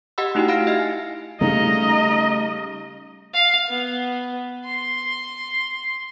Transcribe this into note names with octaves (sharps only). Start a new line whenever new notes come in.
G4 D#5 F#5 B5 E6
A3 D#4 E4 F#4 G4 G5
F5 B5 F6 A#6 D7
D#4 D#5 E5 F6 C7
G#5
C#3 G3 A3 D#4 D#5 A#5
F5
B3
C6